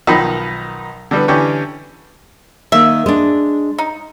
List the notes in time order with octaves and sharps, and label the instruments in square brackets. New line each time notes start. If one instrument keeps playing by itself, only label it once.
[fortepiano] B1 D#3 F3 D#4 D#5 B5
D3 G3 B3
D3 E3 C#4 G4 C#5
[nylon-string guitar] D#3 A#3 [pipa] E5
[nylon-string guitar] G#3 D4
[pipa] D#4